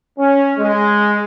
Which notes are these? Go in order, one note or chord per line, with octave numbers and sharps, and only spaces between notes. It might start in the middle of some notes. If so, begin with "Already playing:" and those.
C#4
G#3